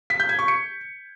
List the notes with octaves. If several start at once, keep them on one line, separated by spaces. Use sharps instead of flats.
B6
G6
G#6
C#6
C#7